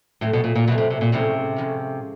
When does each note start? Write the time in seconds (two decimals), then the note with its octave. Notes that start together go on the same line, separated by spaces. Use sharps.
0.21 A2 F#3 A3 C4
0.33 B2
0.44 A#2
0.55 A#2
0.67 B2 F#3 A3 C4
0.78 C3
0.90 C3
1.01 A#2
1.12 A2 C3 F3 G#3 C#4 E4
1.56 A2 F3 G#3 C#4 E4